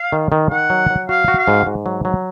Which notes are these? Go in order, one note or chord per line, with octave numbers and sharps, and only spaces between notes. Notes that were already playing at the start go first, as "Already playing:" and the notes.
Already playing: F5
D#3
D#3
D#3 F#5
F#3
F#3
F#4 F5
F#4
F5
G#2
G#2
F#3
F#3